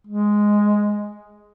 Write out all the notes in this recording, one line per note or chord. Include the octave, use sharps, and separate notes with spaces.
G#3